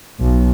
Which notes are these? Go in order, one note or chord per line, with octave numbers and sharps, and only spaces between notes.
B1